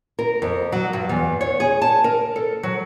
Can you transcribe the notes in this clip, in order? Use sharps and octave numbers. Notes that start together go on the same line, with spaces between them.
A#4
F2
F#3
G2
E2
C#5
G#4
A5
A#4
A4
F#3